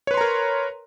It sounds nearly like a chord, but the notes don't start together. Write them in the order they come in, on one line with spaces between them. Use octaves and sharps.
C#5 B4 C6 A#5 A#4